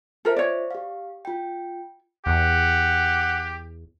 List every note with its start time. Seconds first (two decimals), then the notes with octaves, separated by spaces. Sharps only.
0.25 F4 A4 A#4 C5 E5
0.36 C#5 D5
0.71 G4 F5
1.25 F4 G5
2.26 E2 G4 F#5